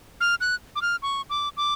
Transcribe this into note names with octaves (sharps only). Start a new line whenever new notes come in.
F6
F#6
D6
F6
C#6
D6
D6